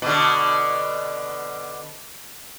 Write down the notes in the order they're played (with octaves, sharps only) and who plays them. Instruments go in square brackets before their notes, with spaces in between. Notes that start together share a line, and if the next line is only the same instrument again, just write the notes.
[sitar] B2 D3